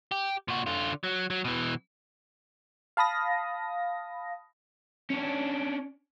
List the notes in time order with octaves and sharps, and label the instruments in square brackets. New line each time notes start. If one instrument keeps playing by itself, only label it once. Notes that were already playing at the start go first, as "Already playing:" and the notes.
[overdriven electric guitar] G4
A#2 F#4
D3 F4
F#3
F#3
B2 E3
[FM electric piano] F5 A5 B5 D#6 A#6
[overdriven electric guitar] C#4 D4